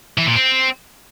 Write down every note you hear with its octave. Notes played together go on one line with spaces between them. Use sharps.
E3
A#2
C4